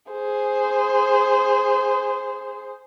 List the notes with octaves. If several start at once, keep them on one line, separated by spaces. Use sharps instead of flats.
G#4 C5